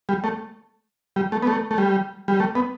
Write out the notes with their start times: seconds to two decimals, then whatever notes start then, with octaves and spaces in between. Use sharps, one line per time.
0.09 G3
0.24 A3
1.16 G3
1.32 A3
1.42 B3
1.47 A3
1.71 A3
1.78 G3
2.28 G3
2.40 A3
2.55 B3